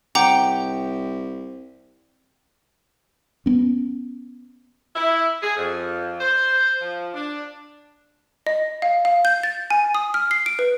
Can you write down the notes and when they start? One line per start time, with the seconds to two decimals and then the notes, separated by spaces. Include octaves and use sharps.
0.15 C2 F#5 G5 A#5 D6
3.46 B3 C#4
4.96 E4
5.43 G#4
5.56 F2
6.21 C5
6.81 F3
7.14 D4
8.47 D#5
8.82 F5
9.05 F5
9.25 G6
9.43 A6
9.71 G#5
9.95 D#6
10.14 F6
10.31 C7
10.46 D7
10.59 B4